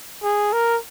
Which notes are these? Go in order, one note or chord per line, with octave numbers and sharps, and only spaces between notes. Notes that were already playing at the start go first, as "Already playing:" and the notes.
G#4
A#4